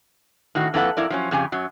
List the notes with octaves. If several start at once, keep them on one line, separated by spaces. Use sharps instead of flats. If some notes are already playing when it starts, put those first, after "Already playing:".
A2 D#3 F#4
F2 A#3 E4 A4 B4 F#5
F2 E4 A#4 D5
F3 F#3 C#4
F2 C#3 G4 G#5
F#2 F#3